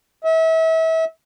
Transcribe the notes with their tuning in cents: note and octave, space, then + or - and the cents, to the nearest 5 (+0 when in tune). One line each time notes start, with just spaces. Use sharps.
E5 -35